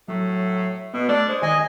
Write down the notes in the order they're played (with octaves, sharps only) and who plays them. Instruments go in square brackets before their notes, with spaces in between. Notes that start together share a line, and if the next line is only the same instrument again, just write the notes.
[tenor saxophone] A2 [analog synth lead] F#3
[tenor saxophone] B2 [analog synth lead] B3
[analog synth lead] A3 [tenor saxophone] D4
[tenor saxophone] G#3 [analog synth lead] C5
[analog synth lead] D#3 [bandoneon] D#5 G#5